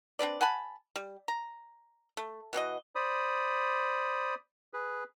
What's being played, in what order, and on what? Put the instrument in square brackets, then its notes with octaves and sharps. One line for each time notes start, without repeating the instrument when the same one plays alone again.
[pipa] C4 D4 B4 D5
F#5 G#5 A5 B5
G3
A#5
A3
B2 E3 F#4 D#5
[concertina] C5 D5 B5 D#6
G#4 B4